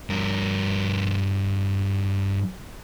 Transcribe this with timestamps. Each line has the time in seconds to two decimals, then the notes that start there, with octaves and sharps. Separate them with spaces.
0.10 G2 A#4